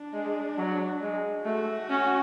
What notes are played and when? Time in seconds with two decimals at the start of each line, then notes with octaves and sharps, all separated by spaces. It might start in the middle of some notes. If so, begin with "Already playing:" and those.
Already playing: D4
0.13 G#3
0.58 F#3
1.02 G#3
1.45 A3 F#4
1.90 C#4